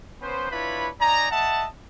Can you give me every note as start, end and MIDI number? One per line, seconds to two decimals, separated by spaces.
0.22 0.50 59
0.22 0.50 61
0.22 0.50 71
0.22 0.50 72
0.52 0.89 62
0.52 0.89 64
0.52 0.89 65
0.52 0.89 71
0.52 0.89 73
0.52 0.89 83
1.01 1.28 63
1.01 1.28 74
1.01 1.28 80
1.01 1.28 82
1.31 1.67 75
1.31 1.67 76
1.31 1.67 78
1.31 1.67 81